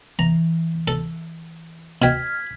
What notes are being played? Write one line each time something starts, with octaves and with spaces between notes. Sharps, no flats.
E3 A#5
A4
B2 G5 F6 G#6 B6